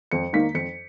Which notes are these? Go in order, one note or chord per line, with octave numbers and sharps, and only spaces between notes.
F2 C#7
D#3 A#3 D#4 B6
F2 C#7